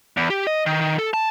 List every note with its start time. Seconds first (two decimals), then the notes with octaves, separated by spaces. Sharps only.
0.17 E2
0.30 G4
0.47 D#5
0.66 D#3
0.81 D#3
0.99 A4
1.14 A5